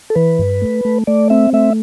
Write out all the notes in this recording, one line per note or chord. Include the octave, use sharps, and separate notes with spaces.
A4
E3 B4
G2
A3
A3
A3 D5
C4 E5
A3 E5